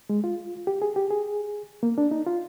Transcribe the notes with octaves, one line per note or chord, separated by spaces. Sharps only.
G#3
F4
G4
G#4
G4
G#4
A#3
D4
D#4
F4